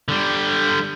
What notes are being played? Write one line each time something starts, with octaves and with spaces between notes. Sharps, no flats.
D3 G3